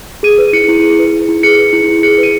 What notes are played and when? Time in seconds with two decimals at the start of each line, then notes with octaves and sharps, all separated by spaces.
0.23 G#4 D#7
0.38 B4
0.53 E4 C#7
0.68 E4
0.83 G#4
0.99 B4
1.13 E4
1.29 E4
1.43 G#4 C#7
1.58 B4
1.73 E4
1.88 E4
2.03 G#4 C#7
2.18 B4
2.23 D#7